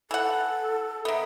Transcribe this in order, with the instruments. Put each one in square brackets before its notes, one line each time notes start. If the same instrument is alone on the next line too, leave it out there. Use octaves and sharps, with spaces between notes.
[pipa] E3 F#5 [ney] A4
[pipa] D#3 B3 [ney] E5